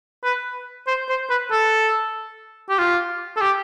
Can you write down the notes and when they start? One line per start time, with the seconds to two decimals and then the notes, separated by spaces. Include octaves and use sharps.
0.24 B4
0.87 C5
1.09 C5
1.30 B4
1.51 A4
2.69 G4
2.78 F4
3.36 A4
3.41 G4